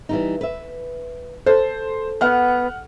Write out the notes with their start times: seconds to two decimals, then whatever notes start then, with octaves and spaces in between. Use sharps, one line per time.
0.09 E3 G3 D#4
0.41 B4 E5
1.46 A4 C5
2.21 B3 F#5 F6